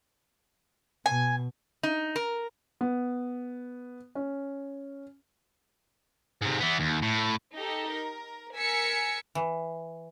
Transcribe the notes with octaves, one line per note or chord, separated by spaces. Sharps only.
B2 G#5
D#4
A#4
B3
C#4
G#2 C3
E3 B3
D#2
A2
D#4 G4 A4
A#4
A#4 G#5 E6 B6 C#7
E3